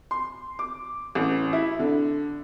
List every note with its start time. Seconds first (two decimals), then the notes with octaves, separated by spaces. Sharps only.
0.11 C6
0.59 D6
1.15 A1
1.53 E4
1.79 D3